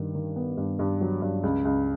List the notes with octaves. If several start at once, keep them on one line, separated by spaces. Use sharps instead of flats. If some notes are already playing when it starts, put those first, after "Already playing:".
Already playing: G2 D#3
D#3
B3
G2
G2
F#3
G2
C#2
C#2